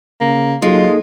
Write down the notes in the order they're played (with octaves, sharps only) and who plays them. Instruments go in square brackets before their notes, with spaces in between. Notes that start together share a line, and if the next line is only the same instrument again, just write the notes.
[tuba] C#3 [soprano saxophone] A#3
[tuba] F#3 [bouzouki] G#3 [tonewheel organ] A#3 D#4 A4 [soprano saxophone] F4